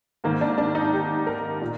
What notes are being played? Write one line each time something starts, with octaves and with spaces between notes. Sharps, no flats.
G#2 D#3 A#3
D4
D4
D#4
G4
A#4
A#2